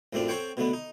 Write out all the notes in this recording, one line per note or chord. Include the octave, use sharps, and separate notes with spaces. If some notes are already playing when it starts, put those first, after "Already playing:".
A1 F#2 A3 C4 D4 F4
C4 A4 C5 C#5 F#5 G5
B2 D3 A3 B3
D#4